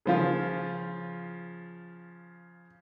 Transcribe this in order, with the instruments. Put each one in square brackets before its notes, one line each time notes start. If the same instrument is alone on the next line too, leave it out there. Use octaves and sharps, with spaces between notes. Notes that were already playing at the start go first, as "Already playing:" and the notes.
[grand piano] C#3 F3 F4